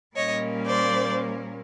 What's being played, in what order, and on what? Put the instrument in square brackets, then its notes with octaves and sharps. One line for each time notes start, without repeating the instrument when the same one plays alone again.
[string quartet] A#2 G3 A#3 C#4 C#5 D#5
C5 D5